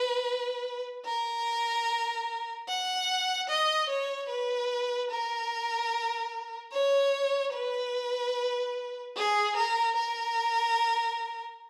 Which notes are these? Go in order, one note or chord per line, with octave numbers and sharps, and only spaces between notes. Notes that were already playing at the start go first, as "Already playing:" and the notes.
Already playing: B4
A#4
F#5
D#5
C#5
B4
A#4
C#5
B4
G#4
A#4
A#4